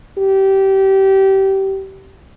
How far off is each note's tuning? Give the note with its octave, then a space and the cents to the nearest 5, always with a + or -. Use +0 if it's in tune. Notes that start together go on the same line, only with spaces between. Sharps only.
G4 -20